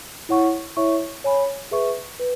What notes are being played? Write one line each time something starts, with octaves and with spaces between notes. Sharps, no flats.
E4 C#5 F#5 C#6
E4 C#5 E5 C#6
C#5 G#5 B5
G#4 B4 E5 C#6
B4